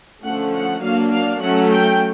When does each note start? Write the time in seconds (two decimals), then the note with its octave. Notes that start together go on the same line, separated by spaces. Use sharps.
0.23 D3 F3 A3 C#4 F#5
0.53 F#5
0.82 F#3 A#3 D4 F5
1.11 F5
1.41 F#3 A3 C#4 F#5
1.71 G5